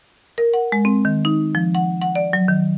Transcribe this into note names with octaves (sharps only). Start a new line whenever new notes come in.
A#4
F#5
G#3
C4
D#3
D#4
F3
F#5
F#5
D5
F#3
D#3